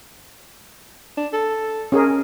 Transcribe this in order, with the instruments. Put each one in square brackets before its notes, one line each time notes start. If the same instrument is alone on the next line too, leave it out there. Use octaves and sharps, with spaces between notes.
[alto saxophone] D4
A4
[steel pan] C#4 G#4 A#4